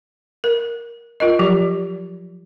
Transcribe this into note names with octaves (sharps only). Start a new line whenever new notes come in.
A#4
F4 A#4 D#5
F3 F#3 G4